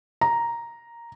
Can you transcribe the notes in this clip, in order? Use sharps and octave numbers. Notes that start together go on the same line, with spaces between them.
A#5